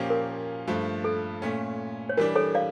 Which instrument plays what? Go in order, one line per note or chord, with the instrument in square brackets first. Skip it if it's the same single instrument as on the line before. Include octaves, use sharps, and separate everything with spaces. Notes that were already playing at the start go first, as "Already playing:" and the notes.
Already playing: [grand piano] A#2 F3 A#3 C#4 G4
[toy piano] A#4
[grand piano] G2 F3 A3
[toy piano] A4
[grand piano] A#2 A3 C#4
[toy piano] C#5
[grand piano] E3 G3 D4 [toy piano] A#4
[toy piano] A4 C#5
D5 F5